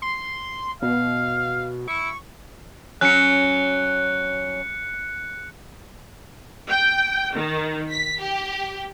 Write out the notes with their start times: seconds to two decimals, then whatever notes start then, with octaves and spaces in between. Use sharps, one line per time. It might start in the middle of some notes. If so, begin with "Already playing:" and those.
0.02 C6
0.82 B2 F5
1.88 E4 C#6
3.01 F#3 C#4 F#6 C#7
6.70 G5
7.35 D#3
7.91 B6
8.20 G4